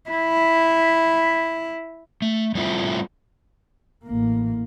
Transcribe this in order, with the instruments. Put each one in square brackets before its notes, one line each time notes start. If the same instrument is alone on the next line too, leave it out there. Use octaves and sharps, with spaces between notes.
[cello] E4 [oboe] B5
[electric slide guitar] A3
G3 A3 C4 E4 F4
[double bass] A1 A#3